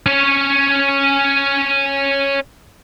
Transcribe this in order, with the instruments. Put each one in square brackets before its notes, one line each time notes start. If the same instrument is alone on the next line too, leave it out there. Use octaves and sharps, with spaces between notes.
[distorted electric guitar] C#4 C#5